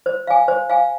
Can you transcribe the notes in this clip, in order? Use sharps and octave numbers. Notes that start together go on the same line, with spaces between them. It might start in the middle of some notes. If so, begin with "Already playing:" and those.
C5
F5 G#5
C5
F5 G#5